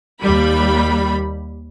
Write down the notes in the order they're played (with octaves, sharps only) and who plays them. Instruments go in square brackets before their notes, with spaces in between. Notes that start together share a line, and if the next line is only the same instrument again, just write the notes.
[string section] D#2 G3 B5